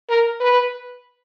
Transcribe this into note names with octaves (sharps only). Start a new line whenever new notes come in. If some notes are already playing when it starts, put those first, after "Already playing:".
A#4
B4